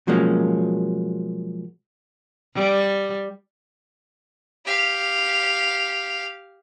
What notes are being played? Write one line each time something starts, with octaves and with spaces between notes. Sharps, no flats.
B2 F3 F#3 G#3 A#3 C#4
G3
G4 F5